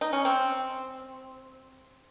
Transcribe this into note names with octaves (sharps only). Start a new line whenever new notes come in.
D#4
C#4
C4